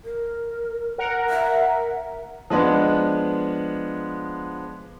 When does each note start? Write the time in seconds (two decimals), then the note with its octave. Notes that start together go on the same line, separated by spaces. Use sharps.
0.05 A#4
0.98 A#4 F#5
1.30 E5
2.50 F3 G#3 B3 D4